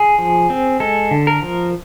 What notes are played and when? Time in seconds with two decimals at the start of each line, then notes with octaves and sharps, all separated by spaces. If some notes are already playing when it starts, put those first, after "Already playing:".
Already playing: G#4
0.19 F3
0.50 C4
0.80 G#3 A4
1.11 D3
1.27 A#4
1.42 F3